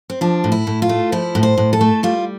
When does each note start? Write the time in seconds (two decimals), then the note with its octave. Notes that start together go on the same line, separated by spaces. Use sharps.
0.10 C4
0.21 F3 D4
0.44 A2
0.52 E4
0.67 A2
0.82 F4
0.89 A3
1.12 F3 E4
1.35 A2
1.43 C5
1.57 A2
1.73 A4
1.81 A3
2.03 G3 F4